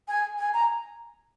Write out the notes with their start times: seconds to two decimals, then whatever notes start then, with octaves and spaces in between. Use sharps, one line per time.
0.08 G#5
0.39 G#5
0.53 A#5